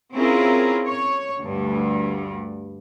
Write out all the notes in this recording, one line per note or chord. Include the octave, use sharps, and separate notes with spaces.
C4 C#4 E4 F4 G#4 A#4
C#5
D2 G2